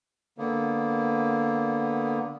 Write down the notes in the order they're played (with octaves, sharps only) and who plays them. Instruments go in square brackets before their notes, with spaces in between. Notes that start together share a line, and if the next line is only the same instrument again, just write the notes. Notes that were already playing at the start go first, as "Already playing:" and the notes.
[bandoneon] D3 A#3 B3